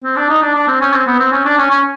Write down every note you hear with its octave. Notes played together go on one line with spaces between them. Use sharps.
C4
D4
D#4
D4
D4
C4
C#4
C4
B3
C4
C#4
D4
C#4
C#4